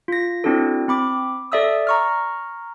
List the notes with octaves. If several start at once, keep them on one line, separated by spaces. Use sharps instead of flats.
F4 A#6
C4 D4 E4 F#4 A4
C4 B5 D6
A4 D5 E5 D#6 E6
A#5 C#6 F6